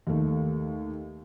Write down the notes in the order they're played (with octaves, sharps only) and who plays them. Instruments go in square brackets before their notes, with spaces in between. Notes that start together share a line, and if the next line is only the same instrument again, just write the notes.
[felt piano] D#2 A3